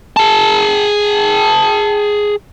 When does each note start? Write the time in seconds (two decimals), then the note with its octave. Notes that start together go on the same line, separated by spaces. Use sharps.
0.17 G#4 A5